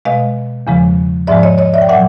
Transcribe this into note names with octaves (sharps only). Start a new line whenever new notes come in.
B2 G#3 D#5 F5
E2 C#3 F3 G#3
G#2 F3 G#3 D5 E5
C#5 D#5
C#5 D#5
D5 E5
G5
A#2 F#3 E5 F#5